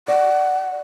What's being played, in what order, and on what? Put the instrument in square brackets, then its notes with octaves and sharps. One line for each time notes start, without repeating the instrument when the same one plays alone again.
[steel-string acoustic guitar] D5 [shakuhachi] F#5